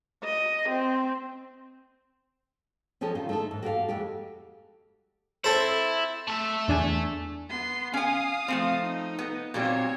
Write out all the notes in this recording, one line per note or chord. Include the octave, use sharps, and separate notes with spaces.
D#5
C4
F3 C#4 G4 A4 D#5
D#3 D#4 F4
A3 D#4 A4
G#2
F#4 G4 A4 F5
F2 G#3 G4
C4 E4 A4 C5
A3 E5
E2 D4 G#5
B3 C6
C#4 F5 G#5 D#6
F3 A3 C4
D#4
B3
A#2 F#3 G3 C4 C#5